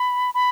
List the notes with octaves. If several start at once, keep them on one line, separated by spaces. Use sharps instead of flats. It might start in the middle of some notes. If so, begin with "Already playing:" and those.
Already playing: B5
B5